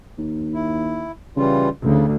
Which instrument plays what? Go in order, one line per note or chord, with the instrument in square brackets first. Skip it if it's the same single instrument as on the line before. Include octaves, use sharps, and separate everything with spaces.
[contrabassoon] D#2
[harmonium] E4
[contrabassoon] C#3 [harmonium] E3 G3 F4
[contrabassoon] A1 [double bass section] D2 [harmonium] C#3